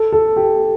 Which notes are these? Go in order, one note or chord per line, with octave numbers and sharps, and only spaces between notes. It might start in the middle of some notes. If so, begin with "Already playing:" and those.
Already playing: A4
A4
G4